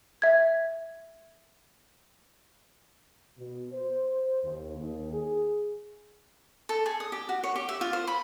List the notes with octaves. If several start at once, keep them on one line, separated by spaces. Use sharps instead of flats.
E5 G#6
B2
C5
D#2
D#2
G#4
A4
G#4
D#6
G4
F#4
C#5
G4
E5
F4
C5
B5